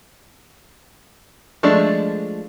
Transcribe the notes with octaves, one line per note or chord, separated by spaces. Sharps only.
F3 G#3 A3 D4